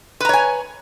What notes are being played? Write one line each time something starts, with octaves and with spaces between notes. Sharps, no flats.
B4 C#5 G#5 A#5